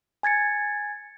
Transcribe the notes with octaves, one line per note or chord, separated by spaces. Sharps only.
G#5 G#6 A6 C#7